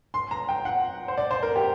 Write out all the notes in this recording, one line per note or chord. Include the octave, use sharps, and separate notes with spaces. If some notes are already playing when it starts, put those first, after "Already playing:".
C6
A#5
G5
F#5
C5
D5
C5
A#4
G4